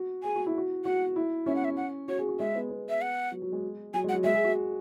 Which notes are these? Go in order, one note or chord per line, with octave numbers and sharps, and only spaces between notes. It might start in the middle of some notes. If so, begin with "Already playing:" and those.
Already playing: F#4
G#4 G#5
F#4
E4
F#4
F#4 F#5
E4
C#4 E5
F#5
E5
F#5
F#4 C#5
G#4
F#4
G#3 E5
B3
B3
E5
F#5
F#3
F#3
G#3
F#3 G#5
G#3
F#5
F#3
G#3 E5
G#4
F#4